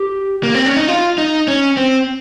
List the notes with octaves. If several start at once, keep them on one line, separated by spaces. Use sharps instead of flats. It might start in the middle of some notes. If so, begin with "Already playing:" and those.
Already playing: G4
A#3
C4
C#4
D#4
F4
D#4
C#4
C4